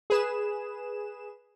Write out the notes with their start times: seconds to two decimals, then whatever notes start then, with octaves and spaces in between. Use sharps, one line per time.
0.10 G#4 B4 E7